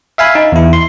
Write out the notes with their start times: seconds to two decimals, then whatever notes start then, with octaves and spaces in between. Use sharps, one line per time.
0.18 E5 F5 G#5 B5
0.35 D#4
0.52 E2 E4
0.73 C6